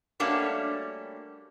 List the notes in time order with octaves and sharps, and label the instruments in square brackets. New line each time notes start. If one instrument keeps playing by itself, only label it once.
[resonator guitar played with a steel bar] G3 A3 A#3 C#4 D4 F#4